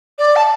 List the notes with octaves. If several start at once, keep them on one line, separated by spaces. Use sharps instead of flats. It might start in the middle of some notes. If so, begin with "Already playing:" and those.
D5
A5